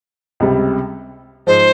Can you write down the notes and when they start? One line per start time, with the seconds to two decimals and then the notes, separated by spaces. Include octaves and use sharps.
0.40 C#2 C3 G3
1.47 G#2 F3 C5